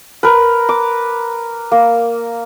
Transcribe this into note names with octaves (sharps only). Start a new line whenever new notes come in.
A#4 B4
D6
A#3